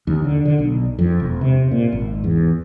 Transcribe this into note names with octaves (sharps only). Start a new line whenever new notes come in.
D#2
D3
D3
B1
F2
E1
C3
A#2
G#1
E2